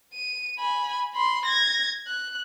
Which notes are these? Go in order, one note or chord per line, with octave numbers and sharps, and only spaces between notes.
D#7
G#5 B5
B5 C6
G#6 A#6
F#6